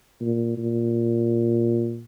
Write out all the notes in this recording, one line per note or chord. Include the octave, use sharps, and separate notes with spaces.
A#2
A#2